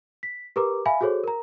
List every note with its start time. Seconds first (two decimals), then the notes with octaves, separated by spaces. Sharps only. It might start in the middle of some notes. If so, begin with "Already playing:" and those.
0.23 B6
0.56 G4 A#4 B4 A#5 D6
0.86 E5 F5 G#5 B5
1.01 F#4 G#4 A4 C5 C#5
1.24 A#4 A#5